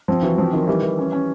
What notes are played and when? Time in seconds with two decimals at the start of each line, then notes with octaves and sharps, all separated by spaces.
0.08 F3 C4
0.22 E3 F#3
0.37 F3 C4
0.53 D#3
0.67 E3 G3
0.82 E3
0.98 C#4
1.12 C#4